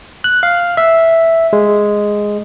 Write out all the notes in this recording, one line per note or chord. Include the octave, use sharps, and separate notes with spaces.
F#6
F5
E5
G#3